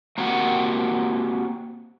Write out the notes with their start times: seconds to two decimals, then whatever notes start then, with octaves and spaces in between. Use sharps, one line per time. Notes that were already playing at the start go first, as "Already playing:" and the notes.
0.18 A#3 C4 F#4 G4 F#5